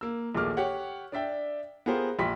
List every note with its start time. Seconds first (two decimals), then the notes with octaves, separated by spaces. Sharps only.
0.01 A#3 E6
0.35 A#1 D#2 A3 G#4 D6 F6
0.57 G4 C#5 F#5
1.12 D4 D5 E5 G5
1.86 B3 F4 G4 G#4 A#4 C5
2.19 A#1 G4 B5 C6 B6